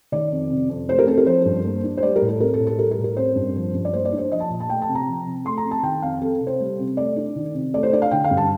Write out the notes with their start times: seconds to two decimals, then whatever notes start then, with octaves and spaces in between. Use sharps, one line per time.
0.12 D#3 D5
0.32 F2
0.50 C3
0.69 F2
0.89 A3 C5
0.99 A#4
1.07 C4 A4
1.18 A#4
1.26 F3 C5
1.45 G2
1.65 A#3
1.84 D4
1.97 C5
2.03 G3 D5
2.16 A#4
2.22 A2
2.29 A4
2.40 C4 A#4
2.54 A4
2.60 A2
2.67 A4
2.79 G3 A#4
2.91 A#4
2.99 A2
3.04 A#4
3.17 C4 C5
3.36 G2
3.56 F3
3.75 G2
3.85 D5
3.93 A#3 C5
4.05 D5
4.12 D4
4.19 C5
4.31 F3 D#5
4.40 A5
4.50 A#2
4.60 A5
4.69 A3 G5
4.82 A5
4.88 C3
4.95 A#5
5.08 F3
5.26 C3
5.45 A3 C6
5.58 A#5
5.65 C4
5.71 A5
5.83 D#3 G5
6.02 F2 F5
6.21 C4 A4
6.41 C3
6.47 C5
6.60 G3
6.79 C3
6.97 A3 D5
7.16 D4
7.36 D#3
7.54 C3
7.74 A3 D5
7.83 C5
7.93 D4 D5
8.02 F5
8.11 D3 G5
8.24 F5
8.31 G2
8.37 A5